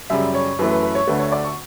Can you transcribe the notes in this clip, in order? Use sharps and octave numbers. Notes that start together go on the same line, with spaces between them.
F#2 C#3 G3 E5
C#5
F#2 E3 A3 B4
B4
B4
C#5
D2 D3 A3 B4
C#5
D5
C#6